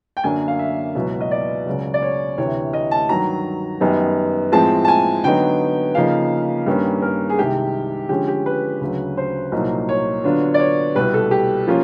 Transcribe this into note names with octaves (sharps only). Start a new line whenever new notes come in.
G5
F#2 D3 F#3 A#3 D4 G#5
F5
E5
C#2 B2 F#3 B3 E4
D#5
D5
C#2 C#3 F#3
D5
C#5
D2 C3 E3 C#5
D#5
A5
G2 D#3 F#3 A#5
F#2 D#3 G3 B3 D#4
A2 F3 G#3 C4 A5
A5
G#5
D3 F#3 B3 D#4 G5
C#3 F3 A#3 D#4 F5
G2 D#3 G3 A#3 C#4
A#4
G#4
C2 C3 D#3 G#3 G4
D3 F3 G#3 C#4 G4
G4
B4
D2 C#3 F#3
C5
C2 A#2 F#3 A#3 D#4
C#5
D3 F#3 B3 D4 F4
D5
C#5
C2 B2 G3 B4
A4
G4
F3 A#3 C#4 F4